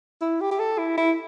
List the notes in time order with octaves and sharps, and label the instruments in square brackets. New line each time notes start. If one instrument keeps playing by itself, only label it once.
[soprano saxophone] E4
G4
G4
A4
E4
E4